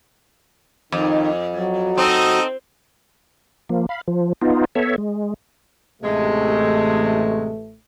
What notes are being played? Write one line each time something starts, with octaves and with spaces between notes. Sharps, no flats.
F2 D#3
F#3
C4 D#4 A4 D#5
F3 A#3
F5 B5
F3
B3 D#4 F4
B3 A4 C#5 E5
G#3
A1 C3 G#3 A3